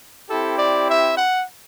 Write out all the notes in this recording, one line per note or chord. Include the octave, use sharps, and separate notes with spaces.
C4 E4 G4 A4
D5
E5
F#5